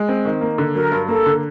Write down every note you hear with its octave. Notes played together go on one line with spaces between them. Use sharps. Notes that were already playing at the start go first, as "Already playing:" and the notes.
Already playing: G#3
C4
D#3
A#3
D3
F#3 A#4
G2
A#3 A4
D3